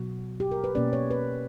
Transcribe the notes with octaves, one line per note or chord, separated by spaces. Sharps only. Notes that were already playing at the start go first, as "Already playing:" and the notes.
Already playing: B2 F#3 F#4
G4
A#4
B4
B2 A#3 C#4 D5
C#5
B4